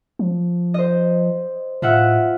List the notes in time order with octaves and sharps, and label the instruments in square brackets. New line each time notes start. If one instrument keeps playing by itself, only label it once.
[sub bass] F3
[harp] C5 D#5
[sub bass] A2 [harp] F4 E5 F#5